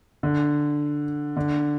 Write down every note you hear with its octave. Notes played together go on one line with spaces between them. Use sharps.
D3
D3